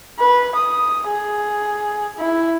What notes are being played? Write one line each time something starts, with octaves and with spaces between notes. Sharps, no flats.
B4
D#6
G#4
E4